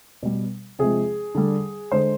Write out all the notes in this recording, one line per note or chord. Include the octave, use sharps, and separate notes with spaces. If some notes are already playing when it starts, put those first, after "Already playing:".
B2 G3
C3 F3 G#3 G#4
D3 G3
D3 G#3 C5